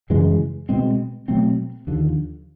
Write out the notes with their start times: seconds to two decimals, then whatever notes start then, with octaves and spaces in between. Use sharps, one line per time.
0.10 F#2 C#3 E3 G#3
0.69 B2 G#3 C4
1.28 B2 F#3 A3 C4
1.87 D#2 D3 F3